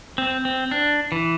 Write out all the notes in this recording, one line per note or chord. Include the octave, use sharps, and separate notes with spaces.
C4
C4
D4
E3